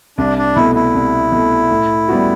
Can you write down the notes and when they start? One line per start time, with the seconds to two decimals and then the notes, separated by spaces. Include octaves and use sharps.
0.18 C2 D4
0.38 D4
0.56 B2 A3 E4
0.75 E4
0.95 C2
1.32 B2 A3
1.71 A2
2.08 G3 B3 F#4